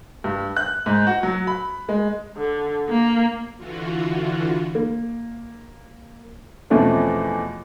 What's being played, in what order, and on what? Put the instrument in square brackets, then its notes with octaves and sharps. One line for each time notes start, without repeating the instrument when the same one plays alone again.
[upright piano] G2
F#6
G#2
F#4
F#3
B5
G#3
[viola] D3
A#3
[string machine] D3 E3 F4 F#4
[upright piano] A#3
E2 B2 F3 A3 C4 C#4